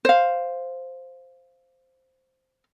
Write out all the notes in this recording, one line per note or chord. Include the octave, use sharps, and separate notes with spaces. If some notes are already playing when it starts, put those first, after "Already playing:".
C5 F5